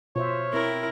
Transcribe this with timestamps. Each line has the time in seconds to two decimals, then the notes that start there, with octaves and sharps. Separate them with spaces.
0.16 B2 F4 C5 C#5 E5
0.54 C4 E4 A#4